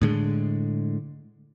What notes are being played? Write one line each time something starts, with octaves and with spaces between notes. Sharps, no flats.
A2 D3 G#3